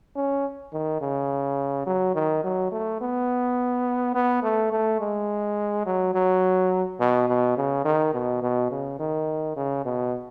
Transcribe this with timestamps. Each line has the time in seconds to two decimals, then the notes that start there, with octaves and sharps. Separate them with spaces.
0.16 C#4
0.73 D#3
1.01 C#3
1.86 F#3
2.15 D#3
2.44 F#3
2.72 A3
3.01 B3
4.14 B3
4.43 A3
4.72 A3
5.00 G#3
5.86 F#3
6.14 F#3
7.00 B2
7.28 B2
7.57 C#3
7.85 D#3
8.14 B2
8.42 B2
8.71 C#3
9.00 D#3
9.56 C#3
9.85 B2